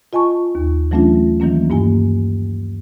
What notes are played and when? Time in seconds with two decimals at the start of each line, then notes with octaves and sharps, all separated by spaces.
0.13 F4 D#5 G#5 A5 C#6
0.55 D#2
0.91 E3 F#3 A3 C#4 D4 F4
1.40 D#3 E3 F#3 A#3 C#4
1.70 G2 A#3 E4 G#5